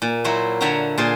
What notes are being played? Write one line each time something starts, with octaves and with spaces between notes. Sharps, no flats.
A#2
F#3 E4 F#4 C5
D3 C#5 E5 F#5 G5 A#5
A#2 F4 G#4 C5 C6